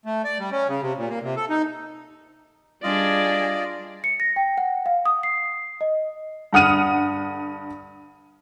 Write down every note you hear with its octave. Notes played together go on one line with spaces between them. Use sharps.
A3
D5
G3
C#4
C#3
C3
A#2
A#3
C3
A4
D#4
G3 D4 F4 G#4 D5 D#5
C#7
A#6
G5
F#5
F5
D#6
C7
D#5
G2 D3 F#5 D#6 F6 D#7